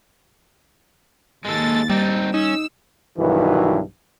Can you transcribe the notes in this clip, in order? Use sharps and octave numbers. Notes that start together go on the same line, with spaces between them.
D#2 G#3 A4 A6
G3 C4 D#4
C#4 D#4 E6
B1 G2 D#3 E3 E4 F#4